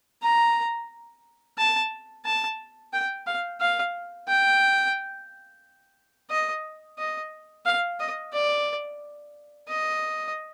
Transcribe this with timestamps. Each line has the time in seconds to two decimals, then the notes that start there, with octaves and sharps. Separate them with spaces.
0.23 A#5
1.58 A5
2.25 A5
2.93 G5
3.26 F5
3.60 F5
4.28 G5
6.30 D#5
6.98 D#5
7.66 F5
8.00 D#5
8.33 D5
9.69 D#5